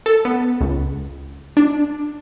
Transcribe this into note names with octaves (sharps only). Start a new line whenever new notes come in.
A4
B3
C#2
D4